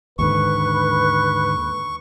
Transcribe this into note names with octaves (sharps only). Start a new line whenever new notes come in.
D#2 G#2 D3 B4 C#6